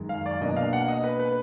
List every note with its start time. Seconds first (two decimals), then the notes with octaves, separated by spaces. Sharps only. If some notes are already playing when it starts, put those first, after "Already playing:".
Already playing: F#2 D#3 G#3
0.09 F5
0.26 D5
0.41 B2 A#3 D4 D#5
0.56 F5
0.73 F#5
0.88 D#5
1.04 B4
1.20 B4